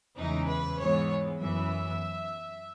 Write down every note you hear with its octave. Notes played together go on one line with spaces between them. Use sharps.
E2 C#3 E3 G#3 D#4
B4
G#2 E3 G#3 B3 C#5
F#2 E3 B3 E5